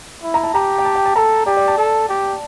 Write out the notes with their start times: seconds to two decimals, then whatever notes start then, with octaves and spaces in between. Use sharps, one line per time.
0.23 E4
0.34 A#5
0.44 A5
0.54 G4 A#5
0.78 G5
0.85 A5
0.95 G5
1.06 A5
1.16 A4 A#5
1.46 G4 D5
1.57 D5
1.68 A5
1.77 A4
2.09 G4